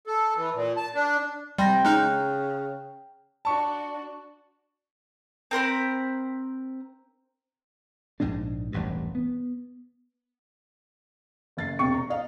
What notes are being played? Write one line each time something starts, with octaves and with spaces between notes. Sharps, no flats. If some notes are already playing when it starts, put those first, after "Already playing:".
A4
E3
A#2
A5
D4
C3 G3 G5 C6 A#6
C#3 G#3 D#4 A#5 F6 F#6
D4 F#4 A5 C#6
C4 A#4 C5 B5
A#1 G#2 G#3 D4
E1 A1 G2
B3
F#1 A6 C7
E1 C3 G5 C#6 C#7
A#5
D#5 F5